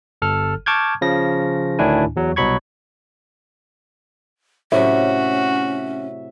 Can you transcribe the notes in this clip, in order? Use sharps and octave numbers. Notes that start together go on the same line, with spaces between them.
G1 A4 F6
A5 C#6 D6 F6 G6 G#6
C#3 F3 A#6
D2 A2 D#3 D4 E4 G#5
E2 F#3
C2 B2 F#3 B5 C#6 G#6
A2 C3 F#3 C#4 F#4 E5